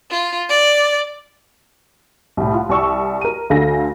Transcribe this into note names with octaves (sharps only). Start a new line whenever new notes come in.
F4
D5
C2 A2
F4 F#5
C2 D5 C#6 E6
A#4 D#7
D2 D3 A4 F5 G#5 A#6